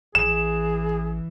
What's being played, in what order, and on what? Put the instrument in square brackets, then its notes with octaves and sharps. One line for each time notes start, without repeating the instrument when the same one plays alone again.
[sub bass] A1 [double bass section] E3 [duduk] G#4 [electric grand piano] E7